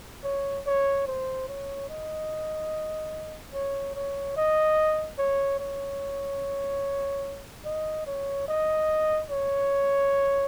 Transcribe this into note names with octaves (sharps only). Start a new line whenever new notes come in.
C#5
C#5
C5
C#5
D#5
C#5
C#5
D#5
C#5
C#5
D#5
C#5
D#5
C#5